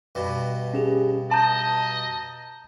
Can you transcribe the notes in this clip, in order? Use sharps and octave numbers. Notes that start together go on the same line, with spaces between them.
G2 B2
C#4 G4 G#4
D#5 A5 A#5 G6